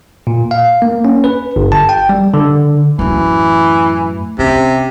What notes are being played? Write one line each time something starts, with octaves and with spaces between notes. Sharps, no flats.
A#2
F5
A#3
C#4
B4
G1
A5
G5
G3
D3
F#2 A2 E3
C3 C#4